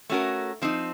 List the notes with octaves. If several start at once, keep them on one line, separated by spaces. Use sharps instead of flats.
A3 C#4 F#4 A#4
F3 C4 D#4